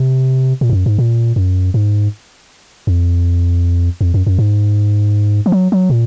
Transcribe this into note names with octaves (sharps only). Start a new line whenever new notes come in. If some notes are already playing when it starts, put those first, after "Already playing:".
Already playing: C3
A#2
G#2
F#2
G#2
A#2
F#2
G#2
F2
F2
F#2
F#2
G#2
F3
F#3
F#3
A#2